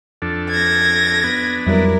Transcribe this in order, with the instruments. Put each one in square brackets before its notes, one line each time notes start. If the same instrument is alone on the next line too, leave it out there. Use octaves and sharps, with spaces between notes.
[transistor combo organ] F2 D4 A4
[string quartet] G#6 A#6
[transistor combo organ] B3 D4
[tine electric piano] F2 F#3 G3 [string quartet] E4 A#4